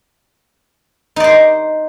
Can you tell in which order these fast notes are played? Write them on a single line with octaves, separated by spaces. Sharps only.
D#4 D5 C5